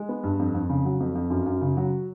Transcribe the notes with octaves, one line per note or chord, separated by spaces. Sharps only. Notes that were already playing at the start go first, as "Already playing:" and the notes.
Already playing: G#3
B3
G2
F2
F2
C#3
F#3
F2
F2
F#2
F#2
C#3
F#3